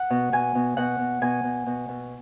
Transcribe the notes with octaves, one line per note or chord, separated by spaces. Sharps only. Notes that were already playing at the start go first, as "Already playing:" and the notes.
Already playing: F#5
B2
B2 G#5
B2
B2 F#5
B2
B2 G#5
B2
B2
B2